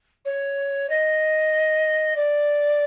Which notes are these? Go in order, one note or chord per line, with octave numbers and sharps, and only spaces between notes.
C#5
D#5
D5